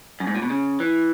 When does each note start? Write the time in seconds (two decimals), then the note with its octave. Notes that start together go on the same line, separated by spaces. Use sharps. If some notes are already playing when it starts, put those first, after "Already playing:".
0.20 F#2
0.27 G#2
0.35 A#2
0.42 B2
0.50 C#3
0.80 E3